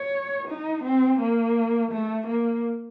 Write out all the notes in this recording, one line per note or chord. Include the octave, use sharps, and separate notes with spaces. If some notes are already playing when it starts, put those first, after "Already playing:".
Already playing: C#5
D#4
C4
A#3
A3
A#3